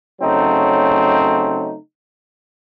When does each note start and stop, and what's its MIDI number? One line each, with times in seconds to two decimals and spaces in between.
0.21 1.76 49
0.21 1.76 54
0.21 1.76 57
0.21 1.76 60
0.21 1.76 63